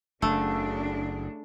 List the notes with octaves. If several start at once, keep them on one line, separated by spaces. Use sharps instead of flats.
F#1 C#3 A3 D4